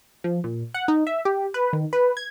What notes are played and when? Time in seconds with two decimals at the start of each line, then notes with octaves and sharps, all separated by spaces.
0.24 F3
0.44 A#2
0.74 F#5
0.88 D#4
1.07 E5
1.25 G4
1.54 B4
1.73 D#3
1.93 B4
2.17 G#6